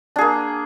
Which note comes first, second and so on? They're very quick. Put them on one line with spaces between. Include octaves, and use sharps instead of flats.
D4 G#4 A#3